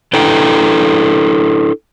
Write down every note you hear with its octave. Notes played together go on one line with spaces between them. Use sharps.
D4 E4 A4 B4 G5 A#5